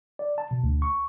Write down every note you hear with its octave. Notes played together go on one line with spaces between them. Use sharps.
D5
A5
B2
D2
C#6